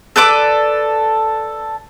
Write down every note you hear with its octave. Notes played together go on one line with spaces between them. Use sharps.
A4 B4 D5 D6